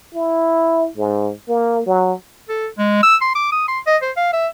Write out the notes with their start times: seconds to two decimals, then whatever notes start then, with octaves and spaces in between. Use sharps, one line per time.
0.14 E4
0.97 G#2
1.49 A#3
1.86 F#3
2.49 A4
2.78 G#3
3.03 E6
3.21 C6
3.35 D6
3.52 D#6
3.68 C6
3.87 D#5
4.02 C5
4.17 F5
4.33 E5